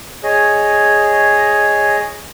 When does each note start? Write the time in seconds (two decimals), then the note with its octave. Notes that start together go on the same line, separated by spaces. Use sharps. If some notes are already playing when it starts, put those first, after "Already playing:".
0.24 G#4 C#5 D#5